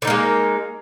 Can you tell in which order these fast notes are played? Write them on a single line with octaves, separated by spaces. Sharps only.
D3 D#4 A#3 G#3